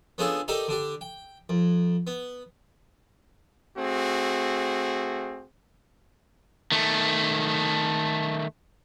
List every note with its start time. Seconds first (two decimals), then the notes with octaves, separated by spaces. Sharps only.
0.18 B3 C#4 D4 F4 G#4 A4
0.48 D#4 G4 A4 A#4 D5 D#5
0.68 D3 D4 G4
1.01 G5
1.49 F2
2.07 B3
3.76 A3 C4 F#4 G#4
6.72 D#3 A3